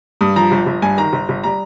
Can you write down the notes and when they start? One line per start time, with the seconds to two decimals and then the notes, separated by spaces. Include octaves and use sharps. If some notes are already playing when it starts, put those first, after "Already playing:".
0.21 G2 D#6
0.36 F3 A#5
0.52 G1
0.66 G1
0.82 G2 G#5
0.97 D#3 A#5
1.13 G1
1.29 G1
1.44 G3 A#5